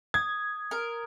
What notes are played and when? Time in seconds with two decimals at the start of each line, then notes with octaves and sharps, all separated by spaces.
0.14 D#6 G#6
0.71 A#4